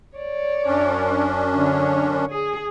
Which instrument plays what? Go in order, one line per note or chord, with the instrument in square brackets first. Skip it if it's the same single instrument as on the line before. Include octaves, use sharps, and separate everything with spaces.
[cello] C#5 D5
[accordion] F#2 C#4 D4
[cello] D3 C#5
G#4